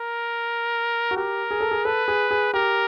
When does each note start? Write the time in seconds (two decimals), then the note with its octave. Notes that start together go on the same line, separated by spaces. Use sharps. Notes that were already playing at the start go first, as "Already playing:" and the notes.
Already playing: A#4
1.11 F#4
1.16 G4 A#4
1.51 G#4
1.60 A4
1.71 G#4
1.85 A4 B4
2.08 G#4
2.31 G#4
2.54 G4 A#4